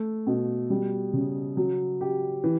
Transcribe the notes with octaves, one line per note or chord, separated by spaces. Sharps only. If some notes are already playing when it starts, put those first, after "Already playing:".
Already playing: A3
B2
G3
C#3
F#3
G4
E3